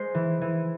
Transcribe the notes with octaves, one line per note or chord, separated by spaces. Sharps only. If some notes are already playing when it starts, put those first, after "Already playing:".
Already playing: G#3 C5
E3
E3